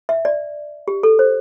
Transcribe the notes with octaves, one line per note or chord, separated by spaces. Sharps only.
E5
D5
G4
A4
C5